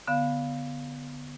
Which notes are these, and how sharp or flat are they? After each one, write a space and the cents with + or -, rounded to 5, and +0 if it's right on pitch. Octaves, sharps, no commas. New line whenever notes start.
D3 -20 B3 +0 F5 +0